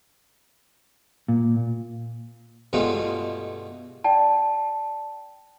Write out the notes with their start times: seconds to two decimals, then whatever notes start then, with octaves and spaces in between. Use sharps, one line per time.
1.28 A#2
2.73 G2 B2 G#3 A3 F4
4.04 D5 G5 A5